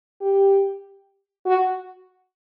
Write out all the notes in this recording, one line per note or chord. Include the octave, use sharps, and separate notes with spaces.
G4
F#4